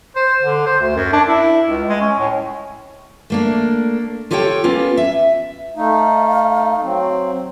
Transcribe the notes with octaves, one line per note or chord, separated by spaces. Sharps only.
C5
D3
C5
D2
F#2
D4
E4
C#2
G#3
C#4
A2
A3 A#3 D4
F4 G4 A4 C#5 F#5 G5
A#3 B3 C#4 F4
E5
A3 D#4 F5
F#3 C4